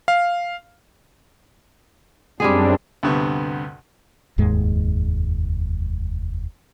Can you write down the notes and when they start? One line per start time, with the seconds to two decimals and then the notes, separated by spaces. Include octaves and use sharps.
0.08 F5
2.40 F#2 G3 G#3 C4 D4 G#4
3.03 D2 G2 C3 B3 C#6
4.38 F1 D#2 G#2 G#3